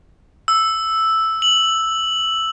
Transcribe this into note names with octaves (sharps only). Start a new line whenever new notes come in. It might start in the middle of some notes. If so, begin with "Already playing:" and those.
E6
F#7